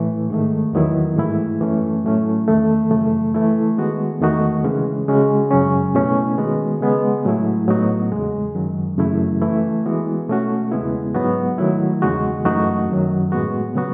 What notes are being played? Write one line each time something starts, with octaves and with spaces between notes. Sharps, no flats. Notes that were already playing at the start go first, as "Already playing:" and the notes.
Already playing: A2 E3 A3
G#2 D#3 A3
E2 D#3 F#3 B3 E4
G#2 E3 A3 E4
F#2 E3 A3 C#4
A2 F#3 A3 C#4 E4
E2 D#3 A3
F#2 C#3 E3 A3
E3 A3 E4
D#3 G#3 B3 F#4
E2 D#3 A3 D#4 F#4
C#3 E3 G#3 C#4
C#3 G#3 C#4 F#4
F#2 C#3 F#3 C#4
B2 A3 C#4 E4
D#3 G#3 B3 F#4
C#3 G#3 B3
A2 F#3 A3 E4
A2 F#3 B3 D#4 F#4
E2 C#3 G#3
F#2 D#3 F#3
F#2 C#3 E3 A3 E4
E3 A3 E4
E3 G#3 B3 F#4
B2 A3 C#4 F#4
E2 C#3 G#3 B3 E4
G#2 F#3 B3 D#4 F#4
D#3 F#3 A3 E4
E2 C#3 G#3 D#4 F#4
F#2 E3 A3 D#4 F#4
F#2 D#3 F#3
A2 G#3 B3 F#4
C#3 F#3 B3 F#4